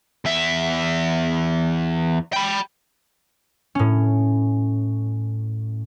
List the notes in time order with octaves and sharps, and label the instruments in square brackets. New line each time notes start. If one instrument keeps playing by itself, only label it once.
[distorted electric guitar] E2 E5
G5 B5
[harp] A2 C#4